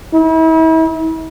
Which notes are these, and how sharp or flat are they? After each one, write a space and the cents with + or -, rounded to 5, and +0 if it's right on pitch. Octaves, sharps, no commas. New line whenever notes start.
E4 -40